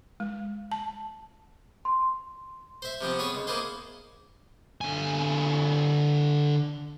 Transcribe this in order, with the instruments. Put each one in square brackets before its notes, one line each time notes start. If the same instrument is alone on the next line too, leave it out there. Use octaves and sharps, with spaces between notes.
[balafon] G#3
A5
[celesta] C6
[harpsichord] C5 E5
C3 F3 B3 C4
B3 G#4 C#5
C#2
A#3 B3 E4 G#4 C5
[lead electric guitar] D3 G#5